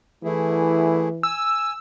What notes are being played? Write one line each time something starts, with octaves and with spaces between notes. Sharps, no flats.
E3 A3 E4 G#4
G#5 E6